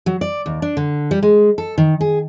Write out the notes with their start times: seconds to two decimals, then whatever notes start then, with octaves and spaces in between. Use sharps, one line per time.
0.06 F#3
0.21 D5
0.46 D#2
0.62 D4
0.77 D3
1.11 G3
1.23 G#3
1.58 A4
1.78 D#3
2.01 G#4